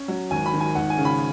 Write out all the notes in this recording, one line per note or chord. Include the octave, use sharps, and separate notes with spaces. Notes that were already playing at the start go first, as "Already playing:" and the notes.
Already playing: C#4
F#3
G#1 G#5
B5
D#3
G#5
G#1 F#5
G#5
C#3
B5